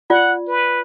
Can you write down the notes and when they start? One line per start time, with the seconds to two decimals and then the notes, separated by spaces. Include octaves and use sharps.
0.10 F4 D5 F#5
0.48 B4